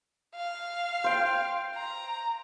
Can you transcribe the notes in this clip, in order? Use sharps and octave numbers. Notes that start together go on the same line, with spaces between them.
F5
C5 G5
A#5